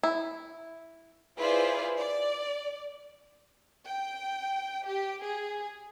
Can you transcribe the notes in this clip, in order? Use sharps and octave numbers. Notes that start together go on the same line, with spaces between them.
E4
E4 F4 G#4 B4 C5 D5
D5
G5
G4
G#4